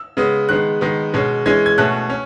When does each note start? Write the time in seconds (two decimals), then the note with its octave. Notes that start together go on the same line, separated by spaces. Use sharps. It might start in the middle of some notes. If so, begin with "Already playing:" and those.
Already playing: E6
0.17 C#3 G#3 B3
0.49 D#3 G#3 B3 F#6
0.81 D#3 G#3 B3
1.14 B2 G#3 C#4
1.46 E3 G#3 C#4 G#6
1.66 G#6
1.78 B2 A3 C#4 F#6
2.10 C#4